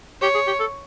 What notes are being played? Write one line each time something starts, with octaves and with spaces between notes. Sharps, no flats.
G4 C#5
G#4
G4
A4